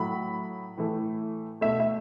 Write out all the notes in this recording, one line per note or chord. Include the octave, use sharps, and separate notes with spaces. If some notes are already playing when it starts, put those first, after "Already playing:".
Already playing: A2 F#3 A3 B5
A2 E3 A3
B2 A3 E5
E5